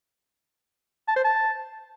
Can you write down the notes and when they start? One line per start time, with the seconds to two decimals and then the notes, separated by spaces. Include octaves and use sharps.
1.08 A5
1.16 C5
1.24 A5